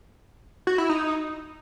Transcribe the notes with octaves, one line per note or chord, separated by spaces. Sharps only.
F#4
E4
D#4